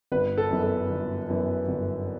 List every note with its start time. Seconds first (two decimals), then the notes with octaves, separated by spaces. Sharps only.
0.12 G1 B4
0.38 A4
0.50 F#2 E3 B3
0.63 A4
0.90 G1
1.29 F#2 E3 B3
1.68 G1